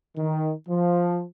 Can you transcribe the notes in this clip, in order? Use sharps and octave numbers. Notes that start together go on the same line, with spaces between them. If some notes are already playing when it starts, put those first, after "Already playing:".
D#3
F3